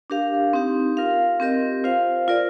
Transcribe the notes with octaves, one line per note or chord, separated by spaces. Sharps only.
D4 G4 A#4 F5
C4 D#4 G4
F4 A#4 F5
C4 G4 A#4 D#5
F4 C5 F5
F4 A#4 D5